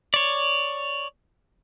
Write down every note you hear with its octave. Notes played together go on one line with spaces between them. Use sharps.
C#5 D5